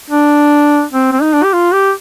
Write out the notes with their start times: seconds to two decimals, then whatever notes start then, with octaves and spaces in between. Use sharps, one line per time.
0.10 D4
0.92 C4
1.12 C4
1.22 D#4
1.33 D4
1.44 G4
1.53 F4
1.73 G4